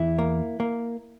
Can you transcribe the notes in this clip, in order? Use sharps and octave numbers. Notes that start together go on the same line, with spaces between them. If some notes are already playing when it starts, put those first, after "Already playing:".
Already playing: E2 E4
A#3
A#3